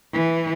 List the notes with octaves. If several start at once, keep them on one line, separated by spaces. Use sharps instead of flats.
E3